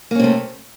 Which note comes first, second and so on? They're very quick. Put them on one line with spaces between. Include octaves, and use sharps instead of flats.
A#3 C#4 C3 A3